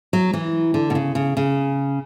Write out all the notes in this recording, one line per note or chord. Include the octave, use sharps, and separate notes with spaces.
F#3
E3
D3
B2
C#3
C#3
C#3